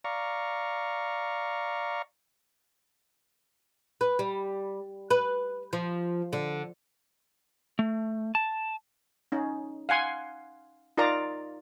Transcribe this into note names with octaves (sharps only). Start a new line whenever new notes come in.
D5 F5 A#5 C#6
B4
G3
B4
F3
D3
A3
A5
C#4 D#4
F5 F#5 G#5 C6
D#4 F4 A#4 D5 F5 A#5